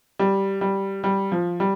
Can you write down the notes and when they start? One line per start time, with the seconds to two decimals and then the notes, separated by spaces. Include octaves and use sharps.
0.19 G3
0.61 G3
1.04 G3
1.32 F3
1.60 G3